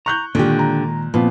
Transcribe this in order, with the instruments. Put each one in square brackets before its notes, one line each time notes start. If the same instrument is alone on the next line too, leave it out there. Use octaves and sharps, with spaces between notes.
[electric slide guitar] A#5 [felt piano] C#6 F#6 G6
[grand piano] A#2 [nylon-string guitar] D3 G4 [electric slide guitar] D#3 G#3
[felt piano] A#5
[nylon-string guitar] A#2 [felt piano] F3 B3 C4